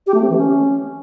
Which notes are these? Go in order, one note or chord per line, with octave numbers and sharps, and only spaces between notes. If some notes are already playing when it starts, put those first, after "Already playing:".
G4
A3
C4
E3
C#4